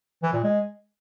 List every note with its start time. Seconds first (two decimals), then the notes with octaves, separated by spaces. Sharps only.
0.23 E3
0.33 A#2
0.44 G#3